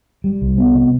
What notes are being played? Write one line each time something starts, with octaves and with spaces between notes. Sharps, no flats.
G3
C2
B3
C3